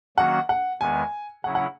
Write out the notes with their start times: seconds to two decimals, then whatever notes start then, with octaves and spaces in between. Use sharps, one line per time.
0.17 D#3 F#3 A#3 C#4 F#4 F#5
0.49 F#5
0.80 E2 D#3 G#3 B3 G#5
1.44 C#3 F#3 C#4 E4 F#5
1.55 F#5